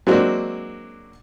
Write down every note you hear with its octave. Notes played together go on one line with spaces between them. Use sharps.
F#3 G#3 A#3 C4 D4 F#4